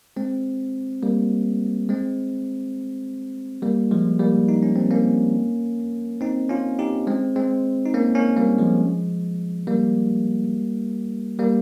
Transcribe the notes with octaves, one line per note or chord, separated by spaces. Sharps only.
G#3 C4
G3 A#3
G#3 C4
G3 A#3
F3 G#3
G3 A#3
D#4
C#4
C4
A#3 C#4
C4 D#4
C#4 F4
D#4 G4
G#3 C4
G#3 C4
D#4
A#3 C#4
A#3 C#4
G3 A#3
F3 G#3
G3 A#3
G3 A#3